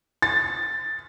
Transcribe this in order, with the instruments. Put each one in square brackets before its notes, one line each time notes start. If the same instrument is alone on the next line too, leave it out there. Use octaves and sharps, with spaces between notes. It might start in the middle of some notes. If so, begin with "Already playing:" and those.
[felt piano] A6